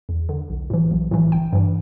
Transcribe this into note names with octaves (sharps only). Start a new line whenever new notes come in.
E2
D3
B1
A2 E3
B1
A2 E3
G1 G5
G2 E3